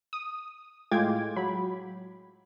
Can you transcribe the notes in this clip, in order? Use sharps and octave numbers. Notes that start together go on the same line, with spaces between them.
D#6
A2 G#3 F4 G5 D6 G#6
F#3 B5